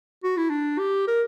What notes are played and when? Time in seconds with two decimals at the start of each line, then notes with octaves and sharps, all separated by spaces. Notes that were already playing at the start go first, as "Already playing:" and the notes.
0.23 F#4
0.37 E4
0.50 D4
0.79 G4
1.08 A#4